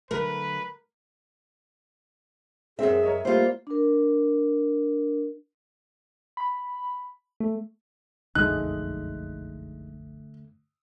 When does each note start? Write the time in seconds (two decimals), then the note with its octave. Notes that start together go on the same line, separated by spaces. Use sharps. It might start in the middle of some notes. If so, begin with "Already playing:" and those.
0.11 D3 F#3 A3 A#4 B4
2.79 F#2 G#3 C4 G#4 E5
3.03 A#4 C#5 D#5
3.25 G3 A3 A#3 F4 C5
3.67 D4 A#4
6.37 B5
7.40 A3
8.35 F#1 B1 F2 D3 G#3 A3 D#4 F#6